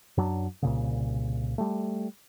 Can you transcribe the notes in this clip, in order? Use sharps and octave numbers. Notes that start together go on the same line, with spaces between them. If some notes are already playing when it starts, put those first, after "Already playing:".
F#2 F#3 D4
C2 A#2 C#3
G3 A3